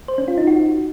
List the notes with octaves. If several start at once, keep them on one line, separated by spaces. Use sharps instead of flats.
C5
C#4
F4
D#4
F#4